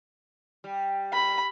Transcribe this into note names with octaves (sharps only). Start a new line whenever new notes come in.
G3
B5